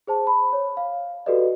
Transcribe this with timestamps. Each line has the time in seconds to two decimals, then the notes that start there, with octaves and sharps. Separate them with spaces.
0.07 G#4 C5 A5
0.27 B5
0.53 C#5
0.77 F5
1.26 F#4 G4 A4 B4 D5 D#5